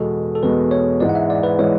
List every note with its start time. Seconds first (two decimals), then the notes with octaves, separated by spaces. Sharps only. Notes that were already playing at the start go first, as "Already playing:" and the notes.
Already playing: E2 B2 G#3 A4
0.35 A4
0.43 E2 B2 G#3 B4
0.71 C#5
1.00 G#2 E3 G#3 D5
1.09 F#5
1.15 E5
1.30 D5
1.43 B4
1.59 E3 G#3 C#5